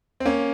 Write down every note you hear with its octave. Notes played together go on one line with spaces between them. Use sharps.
C4
A#3 C#4